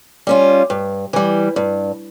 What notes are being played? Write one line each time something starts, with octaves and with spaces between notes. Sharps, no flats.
G3 C#4 F4
G2
E3 G3
G2